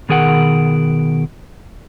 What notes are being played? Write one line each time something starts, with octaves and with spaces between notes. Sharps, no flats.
B2 D#3 G#4 A#4 F#5